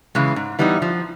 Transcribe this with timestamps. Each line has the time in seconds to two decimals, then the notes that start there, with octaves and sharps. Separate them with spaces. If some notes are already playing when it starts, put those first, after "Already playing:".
0.15 C#3 E3 G#3
0.36 G#2
0.59 E3 G3 B3 D#4
0.82 F3